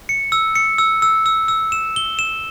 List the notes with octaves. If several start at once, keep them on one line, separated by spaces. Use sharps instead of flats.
C#7
E6
C#7
E6
E6
E6
E6
E7
G7
E7